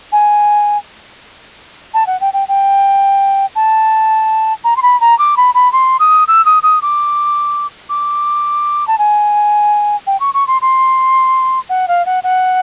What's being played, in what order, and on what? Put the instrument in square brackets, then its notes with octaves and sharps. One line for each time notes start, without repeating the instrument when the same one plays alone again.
[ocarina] G#5
A5
F#5
G5
G5
G5
A5
A#5
C6
B5
A#5
D6
B5
B5
C6
D#6
E6
D#6
D#6
D6
D6
A5
G#5
G5
C#6
C#6
C6
C6
F#5
F5
F#5
F#5